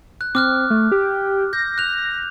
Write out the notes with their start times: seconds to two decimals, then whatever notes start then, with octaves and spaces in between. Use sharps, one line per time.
0.21 F#6
0.35 C4 D6 F6 F#6
0.70 A3
0.92 G4
1.53 G6 A#6
1.78 F#6 F7